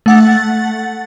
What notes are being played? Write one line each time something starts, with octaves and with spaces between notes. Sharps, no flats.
A3 F#5 A6